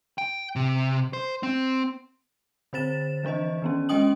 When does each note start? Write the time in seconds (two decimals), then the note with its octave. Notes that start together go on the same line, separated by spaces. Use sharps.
0.18 G5
0.56 C3
1.13 C5
1.43 C4
2.73 D3 C4 C5 A6 E7
3.24 E3 F3 D4 C5 D#5
3.62 D#3 B3 C#4
3.89 G#3 C#4 D#5 G5 D#6 F#7